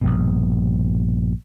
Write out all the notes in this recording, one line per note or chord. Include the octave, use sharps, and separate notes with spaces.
A#1 G2 B2